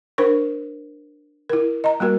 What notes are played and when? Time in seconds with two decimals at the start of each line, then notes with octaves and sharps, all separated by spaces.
0.18 D4 A#4 C5 C#6
1.49 E4 A#4
1.84 D#5 A#5
2.00 G3 A#3 F#4 A#4